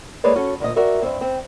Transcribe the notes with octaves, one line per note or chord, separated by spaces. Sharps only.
G#3 A#3 G#4 B4 C#5 D5
C#4 F#4 A4
D2 A#2 D#5
F#4 A#4 D5 E5
G2 C#3 C4
C4